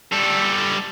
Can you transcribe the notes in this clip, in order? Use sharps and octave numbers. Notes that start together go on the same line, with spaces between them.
G3 A4